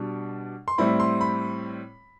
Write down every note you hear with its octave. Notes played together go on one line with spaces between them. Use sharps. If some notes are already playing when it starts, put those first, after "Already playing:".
Already playing: B2 G3 D4
C6
A2 G3 C4 E4 B5
C6
B5